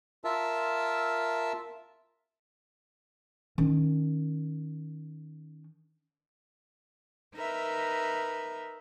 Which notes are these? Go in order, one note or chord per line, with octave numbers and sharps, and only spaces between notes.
F4 A#4 E5 A5 E6
D#3 C#4
D#4 A#4 B4 E5